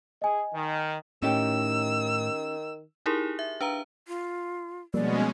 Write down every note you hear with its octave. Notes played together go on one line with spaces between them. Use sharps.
G#4 D#5 G#5
D#3
A2 D#3 C#4 D#4 G4 E6
D#4 E4 G4 G#4 A#4
E5
D4 B4 F5 A#5
F4
B2 F3 G3 G#3 A#3 C#4 D5